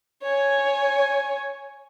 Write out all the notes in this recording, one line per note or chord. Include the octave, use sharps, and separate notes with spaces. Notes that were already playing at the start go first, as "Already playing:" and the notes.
C#5 G#5